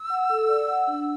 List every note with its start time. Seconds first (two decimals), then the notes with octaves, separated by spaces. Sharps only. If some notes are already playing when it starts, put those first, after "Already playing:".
Already playing: E6
0.10 F#5
0.30 A4
0.48 D5
0.67 F#5
0.87 D4